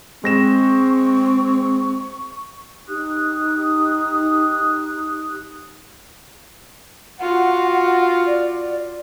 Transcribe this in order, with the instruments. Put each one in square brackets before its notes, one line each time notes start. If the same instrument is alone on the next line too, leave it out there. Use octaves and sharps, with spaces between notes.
[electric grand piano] G#3 A#6 E7 [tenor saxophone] C4 [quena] C#6
[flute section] D#4 G4 D#6 F#6
[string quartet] F4 F#4 [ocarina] F#5
[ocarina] D5